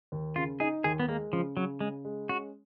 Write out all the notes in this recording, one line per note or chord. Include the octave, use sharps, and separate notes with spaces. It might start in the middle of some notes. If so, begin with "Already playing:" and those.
D#2
C#3 F4
D#4 G#4
D#2 G#4
B3
G#3 A#3
C#3 F3
C#3 F#3
C#3 G#3
G#3
C#4 F#4